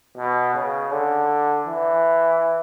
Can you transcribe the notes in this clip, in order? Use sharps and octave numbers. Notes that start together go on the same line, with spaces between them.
B2
C#3
D3
E3